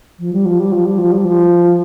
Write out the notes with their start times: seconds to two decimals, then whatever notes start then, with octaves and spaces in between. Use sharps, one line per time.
0.19 F3
0.33 G3
0.45 F3
0.60 G3
0.72 F3
0.85 G3
0.98 F3
1.12 G3
1.25 F3